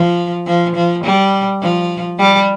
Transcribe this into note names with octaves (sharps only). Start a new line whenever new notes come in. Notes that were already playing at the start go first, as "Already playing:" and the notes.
Already playing: F3
F3
F3
G3
F3
G3